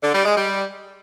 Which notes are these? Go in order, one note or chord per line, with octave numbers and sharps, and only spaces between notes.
D3
G3
G#3
G3